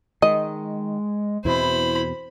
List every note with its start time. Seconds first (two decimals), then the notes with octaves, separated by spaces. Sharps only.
0.22 D#3 G#3 D#5
1.45 E2 B2 C4 E4 C5 B5